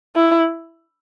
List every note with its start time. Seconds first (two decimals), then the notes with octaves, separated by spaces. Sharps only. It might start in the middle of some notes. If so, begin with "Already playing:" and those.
0.16 E4